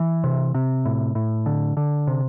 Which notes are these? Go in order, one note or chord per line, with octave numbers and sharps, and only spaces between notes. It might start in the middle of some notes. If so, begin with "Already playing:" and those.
Already playing: E3
C3
C3
A2
A2
D3
D3
C3